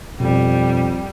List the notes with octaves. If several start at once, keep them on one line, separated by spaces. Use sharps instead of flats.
F2 B2 G3